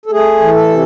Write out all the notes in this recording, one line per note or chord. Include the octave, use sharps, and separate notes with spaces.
A4
A3 G#4
E3
A4
C3